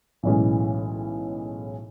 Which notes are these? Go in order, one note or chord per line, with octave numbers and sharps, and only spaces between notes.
B1 A2 E3 G#3 C#4